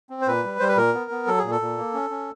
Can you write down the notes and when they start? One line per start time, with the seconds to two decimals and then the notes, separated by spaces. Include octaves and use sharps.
0.10 C4
0.21 C5
0.27 A#2 B4
0.44 G3
0.59 G3 C5
0.68 B4
0.77 A#2 A#4
0.94 B3
1.11 B3
1.27 F#3 A4
1.39 A#2 G#4
1.51 A4
1.61 A#2
1.77 A#3
1.94 C#4
2.10 C#4